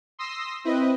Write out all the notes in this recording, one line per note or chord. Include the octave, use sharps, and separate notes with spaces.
C6 D#6 E6 A#6 C7
C4 E4 B4 D#5